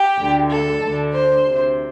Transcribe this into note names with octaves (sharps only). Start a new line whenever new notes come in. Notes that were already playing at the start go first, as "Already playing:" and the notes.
Already playing: G4
D2 D3
A4
D2 D3
C5
D2 C3